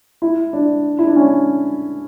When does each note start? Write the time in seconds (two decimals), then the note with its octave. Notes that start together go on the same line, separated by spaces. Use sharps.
0.22 E4
0.53 D4
0.99 E4
1.07 D4
1.16 C#4